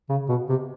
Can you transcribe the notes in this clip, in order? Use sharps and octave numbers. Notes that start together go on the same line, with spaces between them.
C#3
B2
C3